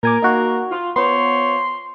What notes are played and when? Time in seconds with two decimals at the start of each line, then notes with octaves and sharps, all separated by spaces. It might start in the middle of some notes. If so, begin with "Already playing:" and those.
0.03 A#2 A#4 G#5 D6
0.22 A#3 D#4 F#4
0.71 F4
0.96 B3 F4 C5 C#5 C6